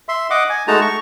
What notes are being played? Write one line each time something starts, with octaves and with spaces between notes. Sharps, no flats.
E5 C6
D#5 F#5 D6
G#5
G#3 A3 D#4 F#4 A5 A#5
C#6